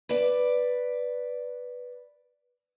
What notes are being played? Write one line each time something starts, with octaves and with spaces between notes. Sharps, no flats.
B4 D5